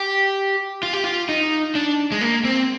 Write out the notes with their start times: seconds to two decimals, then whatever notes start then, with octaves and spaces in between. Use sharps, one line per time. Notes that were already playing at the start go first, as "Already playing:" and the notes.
Already playing: G4
0.83 F4
0.93 G4
1.04 F4
1.29 D#4
1.75 D4
2.12 G#3
2.21 A#3
2.45 C4